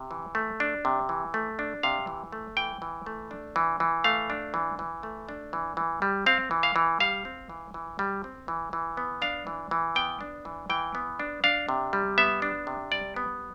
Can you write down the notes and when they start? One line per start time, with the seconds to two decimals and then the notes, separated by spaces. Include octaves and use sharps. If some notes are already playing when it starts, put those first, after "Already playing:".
Already playing: C3
0.11 E3
0.35 A3
0.60 D4
0.85 C3
1.09 E3
1.34 A3
1.59 D4
1.83 C3 F5
2.07 E3
2.32 A3
2.57 E3 G5
2.82 E3
3.06 A3
3.31 D4
3.56 E3
3.80 E3
4.04 A3 F5
4.30 D4
4.54 E3
4.79 E3
5.03 A3
5.29 D4
5.53 E3
5.77 E3
6.02 G3
6.26 C4 F5
6.51 E3
6.63 F5
6.76 E3
7.00 G3 F5
7.25 C4
7.49 E3
7.74 E3
7.99 G3
8.24 C4
8.48 E3
8.73 E3
8.97 B3
9.22 D4 F5
9.47 E3
9.71 E3
9.95 B3 G5
10.21 D4
10.45 E3
10.70 E3 G5
10.95 B3
11.20 D4
11.44 D4 F5
11.69 C3
11.93 G3
12.18 B3 E5
12.42 D4
12.67 C3
12.92 G3 D5
13.16 B3